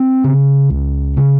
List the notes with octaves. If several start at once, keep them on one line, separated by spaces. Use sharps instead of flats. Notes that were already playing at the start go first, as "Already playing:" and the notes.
Already playing: C4
C#3
C#2
C#3